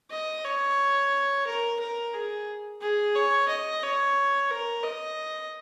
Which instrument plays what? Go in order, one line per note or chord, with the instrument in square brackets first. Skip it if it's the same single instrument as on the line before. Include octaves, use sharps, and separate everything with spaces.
[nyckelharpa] D#5
C#5
A#4
A#4
G#4
G#4
C#5
D#5
C#5
A#4
D#5